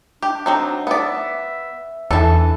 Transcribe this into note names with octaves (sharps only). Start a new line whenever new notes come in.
D4 G4
F#3 C4 D#4
B3 D5 E5
E2 E3 D4 A4